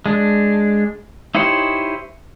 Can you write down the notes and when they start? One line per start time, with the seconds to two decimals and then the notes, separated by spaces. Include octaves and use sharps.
0.06 G#3 D4
1.35 D#4 E4 G4 C5 C#5